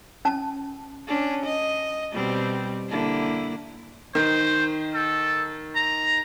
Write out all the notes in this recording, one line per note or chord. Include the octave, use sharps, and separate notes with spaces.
C#4 A5
C#4 D4
D#5
B2 G3 C4
D3 A#3 E4
D#3 C5
A4
A#5